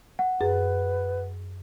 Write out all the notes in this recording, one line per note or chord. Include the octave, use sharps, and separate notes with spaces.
F#5
F#2 G#4 B4 A6